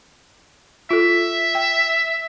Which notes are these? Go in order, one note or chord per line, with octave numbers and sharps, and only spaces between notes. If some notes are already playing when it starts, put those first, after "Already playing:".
F4 A4 E5
G5